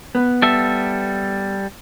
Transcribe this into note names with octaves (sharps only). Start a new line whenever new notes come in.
B3
G3 A4 E5